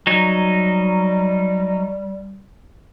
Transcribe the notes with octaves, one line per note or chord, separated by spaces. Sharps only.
F#3 G3 D#4